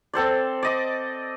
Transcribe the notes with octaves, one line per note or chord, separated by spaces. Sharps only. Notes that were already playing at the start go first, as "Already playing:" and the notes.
C4 A4 C5 D5
D5 D#5 D6